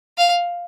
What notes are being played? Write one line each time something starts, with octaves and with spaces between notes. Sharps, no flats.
F5